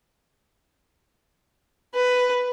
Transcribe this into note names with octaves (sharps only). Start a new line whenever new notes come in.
B4